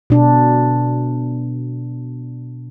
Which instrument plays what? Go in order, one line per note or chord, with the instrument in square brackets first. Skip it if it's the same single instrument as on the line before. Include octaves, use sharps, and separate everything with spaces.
[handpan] B2 D4